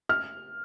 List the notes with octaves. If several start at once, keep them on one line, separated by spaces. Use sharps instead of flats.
F6